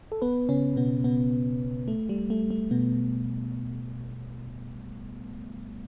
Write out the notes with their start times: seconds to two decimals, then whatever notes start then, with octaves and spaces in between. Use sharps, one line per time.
0.12 A4
0.22 B3 B4
0.49 C#3 C#4
0.76 B2 B3
1.04 B2 B3
1.88 A3
2.09 G3
2.30 A3
2.50 A3
2.71 B2 B3